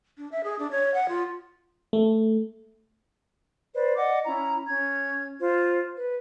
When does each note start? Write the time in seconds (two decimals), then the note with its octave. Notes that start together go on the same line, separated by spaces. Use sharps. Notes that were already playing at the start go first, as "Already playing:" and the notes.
0.18 D4
0.32 E5
0.44 G#4
0.59 D4
0.71 C#5
0.94 F#5
1.09 F4
1.93 A3
3.74 B4 C5 D5
3.96 D5 D#5 F#5 D6
4.25 C#4 E4 A#5
4.68 C#4 G#6
5.41 F4 C5
5.96 B4